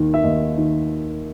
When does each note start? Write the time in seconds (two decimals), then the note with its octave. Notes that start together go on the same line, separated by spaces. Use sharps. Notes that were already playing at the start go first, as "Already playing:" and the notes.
Already playing: D#2 D#3
0.14 E5
0.24 D#2 D#5
0.57 D#3